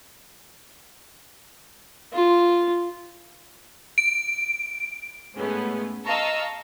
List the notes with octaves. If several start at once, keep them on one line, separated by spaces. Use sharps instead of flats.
F4
D7
A2 G#3 A3 B3 C#4
D#5 F5 A5 A#5 C#6 E6